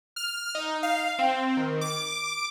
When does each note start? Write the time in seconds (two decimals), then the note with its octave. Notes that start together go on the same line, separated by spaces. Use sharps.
0.16 F6
0.55 D#4
0.83 F5
1.19 C4
1.57 D#3
1.81 D6